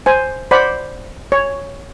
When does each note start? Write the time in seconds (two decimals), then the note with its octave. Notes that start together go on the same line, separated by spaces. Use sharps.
0.06 C5 G#5
0.51 C5 D5 F#5 B5
1.32 C#5